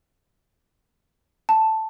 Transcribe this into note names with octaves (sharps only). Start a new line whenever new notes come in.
A5